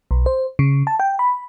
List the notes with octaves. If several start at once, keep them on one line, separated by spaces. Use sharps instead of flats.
B1
C5
C#3
A5
G5
B5